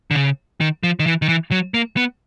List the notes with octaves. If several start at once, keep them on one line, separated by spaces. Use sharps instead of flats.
D3
C#3
D#3
F3
D#3
E3
D#3
E3
F#3
A#3
B3